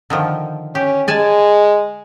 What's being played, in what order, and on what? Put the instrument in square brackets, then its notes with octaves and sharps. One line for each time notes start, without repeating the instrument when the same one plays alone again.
[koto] D3 D#3 F3
[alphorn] C#4 [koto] G4
[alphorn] G#3 [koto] D5 G#5 A5